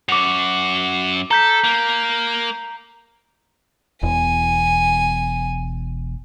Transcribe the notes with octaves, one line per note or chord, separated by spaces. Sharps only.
F#2 F#4 D6 F7
A4 A#5 G6 B6
A#3
E1 E2 G#5